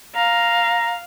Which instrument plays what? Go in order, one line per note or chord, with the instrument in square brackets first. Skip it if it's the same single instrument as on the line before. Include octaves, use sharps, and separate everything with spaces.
[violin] F5 [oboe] A#5